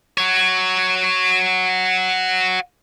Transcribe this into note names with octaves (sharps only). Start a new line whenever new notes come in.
F#4 C#5